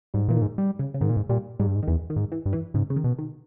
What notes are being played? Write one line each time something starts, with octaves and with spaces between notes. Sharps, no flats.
G#2 G3
A#2 E3
D#3
G#2
G3
C#3
C#3
G#2 D#3
A#2
G#2
A#2 G3
G#2 G3
G2
G#2
D#3
E2 E3
D#3
G#2
E3
G2
E3
G#2 C#3
C#3
D#3
B2
D#3